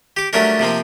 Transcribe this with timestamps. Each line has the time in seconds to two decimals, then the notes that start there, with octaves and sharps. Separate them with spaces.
0.17 G4 D6
0.33 F#3 G3 A3 C#4 D4 A#4
0.59 C3 F3 A#3 C4